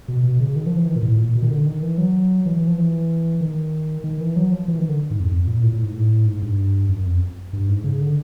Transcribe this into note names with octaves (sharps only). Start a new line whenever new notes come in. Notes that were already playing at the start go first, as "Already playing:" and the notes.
B2
B2
C#3
D#3
F3
E3
D#3
A#2
A2
A#2
B2
D#3
D3
D#3
E3
F#3
E3
E3
F3
E3
D#3
D#3
E3
F#3
F3
E3
D#3
D3
G#2
F2
F2
A#2
A2
A2
G#2
A2
G#2
G2
F#2
F2
G2
G#2
C#3
D3